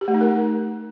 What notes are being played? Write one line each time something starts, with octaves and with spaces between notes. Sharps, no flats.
G4
A3
D#4
A#4